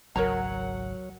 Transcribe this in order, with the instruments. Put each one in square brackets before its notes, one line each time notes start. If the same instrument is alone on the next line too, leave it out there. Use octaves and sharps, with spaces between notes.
[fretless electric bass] G#1 C#2 [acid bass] F#3 [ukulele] A#4 C#5 A#5 [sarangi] F#5